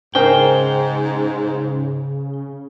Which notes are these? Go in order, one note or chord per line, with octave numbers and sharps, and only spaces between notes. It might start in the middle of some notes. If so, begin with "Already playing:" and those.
G#2 C#3 G#4 A#4 C5 G5